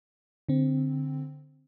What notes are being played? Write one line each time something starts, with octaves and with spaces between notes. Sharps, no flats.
D3 C4